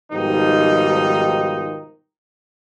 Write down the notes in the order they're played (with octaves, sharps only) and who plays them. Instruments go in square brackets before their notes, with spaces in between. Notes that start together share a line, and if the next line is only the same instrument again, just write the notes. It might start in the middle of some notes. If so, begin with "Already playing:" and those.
[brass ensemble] G#2 B2 D#3 F3 G3 D#4